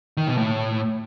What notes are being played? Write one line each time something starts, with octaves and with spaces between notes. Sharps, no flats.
D#3
B2
A2